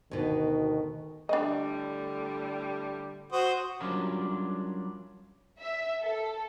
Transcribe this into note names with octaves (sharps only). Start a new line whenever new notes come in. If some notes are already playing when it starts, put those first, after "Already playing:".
D2 B2 D#3
A2 D3 G3 D4 D#5
F#4 C5 D#6
F#3 G3 C#4 D4 F4 A#4
E5
A4